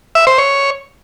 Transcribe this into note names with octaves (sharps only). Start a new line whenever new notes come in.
E5
C5
C#5